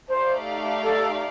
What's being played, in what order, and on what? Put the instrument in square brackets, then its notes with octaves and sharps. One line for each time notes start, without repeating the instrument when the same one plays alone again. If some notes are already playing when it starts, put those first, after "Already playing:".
[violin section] A3 D#4 G4 D5 F5 [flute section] C5
[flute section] A4